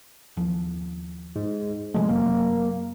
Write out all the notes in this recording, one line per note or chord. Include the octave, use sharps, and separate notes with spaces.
D#2 F3
G#2
C3 F3 G#3 A3
F#2 C3 F#3 A#3